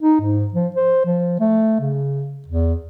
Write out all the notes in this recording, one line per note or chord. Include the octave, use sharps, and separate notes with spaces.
D#4
G#2
F3
C5
F3
A3
C#3
E2